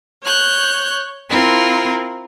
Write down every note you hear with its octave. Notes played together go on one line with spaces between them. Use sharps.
C#5 F#6 G6
C4 E4 F4 A#4